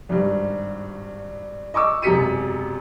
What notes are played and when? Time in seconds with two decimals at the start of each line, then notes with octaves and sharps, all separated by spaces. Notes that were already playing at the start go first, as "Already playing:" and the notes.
0.09 G#1 G2
1.74 D#5 C#6 D6 E6
2.02 E1 F#2 C3 B6 C#7 D#7